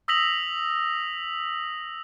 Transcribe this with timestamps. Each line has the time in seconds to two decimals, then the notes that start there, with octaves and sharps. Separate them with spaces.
0.08 D#6 E6 A#6 B6 F7 F#7